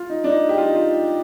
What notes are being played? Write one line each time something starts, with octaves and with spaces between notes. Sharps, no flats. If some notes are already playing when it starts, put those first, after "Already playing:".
Already playing: F4
D#4
D4
D#4
G4
F4
D#4
F4